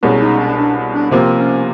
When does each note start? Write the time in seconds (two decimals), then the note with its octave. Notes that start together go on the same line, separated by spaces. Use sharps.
0.03 C2 B2 G#3 C#4 D#4
0.21 D#4
0.39 D4
0.57 D4
0.94 D4
1.11 C3 F3 A#3 C4
1.39 C#4